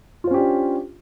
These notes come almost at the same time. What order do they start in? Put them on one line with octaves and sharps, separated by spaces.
F4 C5 C#4 G4 D4